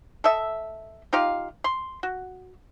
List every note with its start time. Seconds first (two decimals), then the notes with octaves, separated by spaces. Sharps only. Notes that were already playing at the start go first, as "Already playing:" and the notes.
0.24 A4 D#5 E5
1.13 D#4 F4 G4 F5
1.64 C6
2.03 F#4